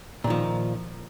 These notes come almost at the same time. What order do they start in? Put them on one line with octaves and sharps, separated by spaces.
A#2 D#3 F3